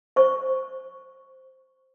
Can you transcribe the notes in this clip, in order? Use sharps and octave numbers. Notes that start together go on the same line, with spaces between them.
C5 C#6